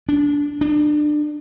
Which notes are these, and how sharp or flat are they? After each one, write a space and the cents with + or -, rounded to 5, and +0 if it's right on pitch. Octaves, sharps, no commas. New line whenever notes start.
D4 -20
D4 +25